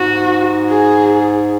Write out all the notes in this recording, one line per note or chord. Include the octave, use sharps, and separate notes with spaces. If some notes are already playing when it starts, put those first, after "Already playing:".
Already playing: G#2 F#4
G#4